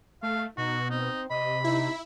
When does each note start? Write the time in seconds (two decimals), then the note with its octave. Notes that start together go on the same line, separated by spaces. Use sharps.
0.23 A3 F5
0.58 B2 D#4 F#4
0.90 C4 D#4
1.30 C3 D#5 B5
1.64 D#4 E4